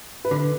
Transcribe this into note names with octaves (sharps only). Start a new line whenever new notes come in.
B4
D3 A4